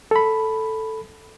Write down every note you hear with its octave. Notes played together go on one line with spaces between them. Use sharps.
A4 B5